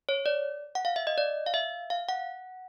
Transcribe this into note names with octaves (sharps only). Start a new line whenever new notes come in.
C#5
D5
F#5
F5
E5
D#5
D5
F5
E5
F5
F#5